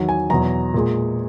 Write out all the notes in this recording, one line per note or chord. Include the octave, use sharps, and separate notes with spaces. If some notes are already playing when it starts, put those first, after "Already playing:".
Already playing: E2 D#3 F#3
G#5
E2 B2 F#3 A#5
A#2 G#3